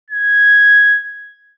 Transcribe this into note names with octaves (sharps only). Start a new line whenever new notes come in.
G#6